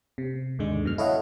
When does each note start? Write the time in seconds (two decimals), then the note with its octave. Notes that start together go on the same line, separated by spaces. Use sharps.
0.18 C3
0.59 D#2 G#2 D3 G#3
0.84 F#2 B2 F6
0.98 E4 A4 C#5 D#5 F5 F#5